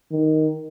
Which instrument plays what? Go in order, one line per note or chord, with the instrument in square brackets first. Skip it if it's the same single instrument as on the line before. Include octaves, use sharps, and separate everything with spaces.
[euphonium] D#3